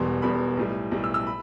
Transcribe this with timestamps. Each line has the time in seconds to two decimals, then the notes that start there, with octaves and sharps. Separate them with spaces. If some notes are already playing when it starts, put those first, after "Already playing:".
Already playing: E1 E2 B2 G3 C6
0.22 E1 E2 B2 G3 B5
0.57 B1 A2 G3
0.91 B1 A2 G3
1.04 E6
1.14 E6
1.27 B5